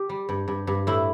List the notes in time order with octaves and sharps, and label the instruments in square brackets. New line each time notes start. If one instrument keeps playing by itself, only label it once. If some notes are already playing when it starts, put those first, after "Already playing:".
Already playing: [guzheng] G4
G3
G2
G2
G2
A2 E4